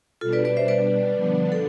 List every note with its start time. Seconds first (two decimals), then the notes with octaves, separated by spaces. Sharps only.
0.21 B2 G3 D4 F4 A4
0.33 B4 D5
0.45 B4 D5
0.57 C5 E5
0.68 B4 D5
1.15 D3 F3 B3 D4
1.52 A4